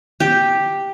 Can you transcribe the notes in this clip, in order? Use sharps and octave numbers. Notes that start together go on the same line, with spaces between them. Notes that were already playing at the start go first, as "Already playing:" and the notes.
G4